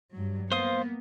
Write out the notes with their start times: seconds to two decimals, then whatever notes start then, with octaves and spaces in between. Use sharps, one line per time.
0.12 G2 F#3
0.52 A#3 B3 C5 F5 D#6